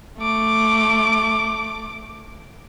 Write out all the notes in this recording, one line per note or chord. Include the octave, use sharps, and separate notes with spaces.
A3 D6